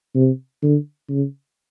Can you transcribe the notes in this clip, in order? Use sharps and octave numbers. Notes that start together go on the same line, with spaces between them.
C3
D3
C#3